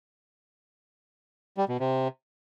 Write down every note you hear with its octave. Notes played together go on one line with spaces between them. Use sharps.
G3
B2
C3